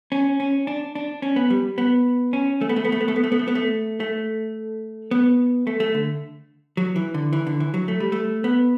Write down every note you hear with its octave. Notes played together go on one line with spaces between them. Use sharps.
C#4
C#4
D4
D4
C#4
B3
G3
B3
C#4
A3
B3
A3
B3
A3
B3
A3
B3
A3
B3
A3
B3
A3
A3
B3
A3
A3
D3
F#3
E3
D3
E3
D3
E3
F#3
A3
G3
A3
B3